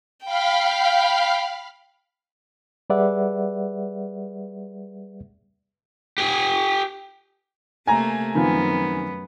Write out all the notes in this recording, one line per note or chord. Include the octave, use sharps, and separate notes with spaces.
F5 G5 B5 F6
G3 G#4 B4 D5 E5 F#5
G4 G#5
C3 A3 A#3 G#5 A#5
F#2 D#3 F3 B3 C4